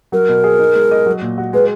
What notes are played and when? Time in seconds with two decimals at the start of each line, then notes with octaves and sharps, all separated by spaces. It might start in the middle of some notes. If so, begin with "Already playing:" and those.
0.12 F#3 A#4
0.29 B2
0.44 G#4
0.59 D#4
0.75 G#3
0.91 D#5
1.06 F#3
1.22 A#2
1.38 F#4
1.53 G#3 B4